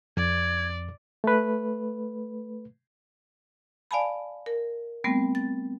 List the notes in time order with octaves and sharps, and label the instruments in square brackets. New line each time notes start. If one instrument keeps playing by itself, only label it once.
[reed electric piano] F2 [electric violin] D5 [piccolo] G#6
[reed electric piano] A3 B4
[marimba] D5 F5 G#5 A5 B5
A#4
G3 A3 B3 C4
A6